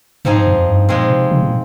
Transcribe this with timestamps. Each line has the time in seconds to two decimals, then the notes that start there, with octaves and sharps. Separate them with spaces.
0.25 G#2 F3 C4 D#4 G#4
0.40 G2
0.47 F2
0.67 G2
0.89 A#2 F3 G#3 C4
1.09 C3
1.32 C3
1.42 A#2